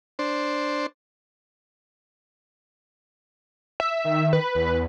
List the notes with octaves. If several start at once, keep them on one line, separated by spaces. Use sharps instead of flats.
D4 C5
E5
D#3
B4
E2